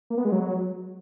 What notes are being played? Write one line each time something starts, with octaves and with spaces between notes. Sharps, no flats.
A#3
B3
G#3
F#3